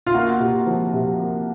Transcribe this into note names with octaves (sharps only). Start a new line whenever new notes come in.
F4
A#3 F#4
C3
F3
C3
A#3